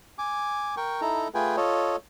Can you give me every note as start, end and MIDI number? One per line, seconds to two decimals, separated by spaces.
0.18 0.75 80
0.18 0.75 86
0.77 1.01 70
0.77 1.01 79
0.77 1.01 85
1.01 1.28 63
1.01 1.28 64
1.01 1.28 69
1.01 1.28 82
1.34 1.56 57
1.34 1.56 65
1.34 1.56 68
1.34 1.56 71
1.34 1.56 79
1.34 1.56 80
1.57 1.96 65
1.57 1.96 69
1.57 1.96 73
1.57 1.96 75